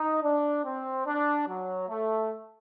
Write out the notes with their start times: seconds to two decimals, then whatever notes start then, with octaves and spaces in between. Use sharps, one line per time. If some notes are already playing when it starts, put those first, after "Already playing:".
Already playing: D#4
0.22 D4
0.65 C4
1.06 D4
1.48 F#3
1.89 A3